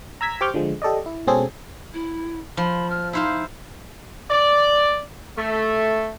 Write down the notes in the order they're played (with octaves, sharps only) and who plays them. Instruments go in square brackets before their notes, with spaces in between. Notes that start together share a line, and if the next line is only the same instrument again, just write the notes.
[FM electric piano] A#5 E6 G#6 B6
G4 C5 C#6 D6 F6 G6
D3 F3 G#3
G4 A4 D5 D#5
E4
B2 G#3 C4 C#4 G#4 A4
[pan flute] E4
[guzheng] F3 [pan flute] B5
[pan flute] F6
[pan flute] D#4 [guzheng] E4 C5 F5
[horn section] D5
A3